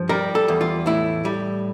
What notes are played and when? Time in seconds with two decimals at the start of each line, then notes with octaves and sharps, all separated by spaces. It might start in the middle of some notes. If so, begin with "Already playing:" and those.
Already playing: G2 F3
0.09 G3 A#4
0.35 A4
0.48 E2
0.61 F4
0.86 A2 E4
1.25 G3